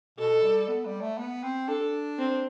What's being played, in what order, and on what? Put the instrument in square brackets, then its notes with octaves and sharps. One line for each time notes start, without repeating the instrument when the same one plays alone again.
[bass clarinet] B2 [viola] A4
[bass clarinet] G3
B3
G3
A3
B3
C4
[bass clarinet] D4 [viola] A4
[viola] C4